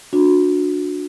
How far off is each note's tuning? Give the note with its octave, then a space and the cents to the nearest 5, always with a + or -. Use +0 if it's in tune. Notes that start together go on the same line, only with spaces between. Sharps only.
D4 +0 F#4 -30